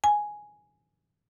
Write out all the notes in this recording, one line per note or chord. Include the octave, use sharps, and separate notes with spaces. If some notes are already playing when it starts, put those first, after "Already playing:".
G#5